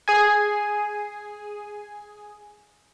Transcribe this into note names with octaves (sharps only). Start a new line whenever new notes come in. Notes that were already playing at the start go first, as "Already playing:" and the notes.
G#4 G#5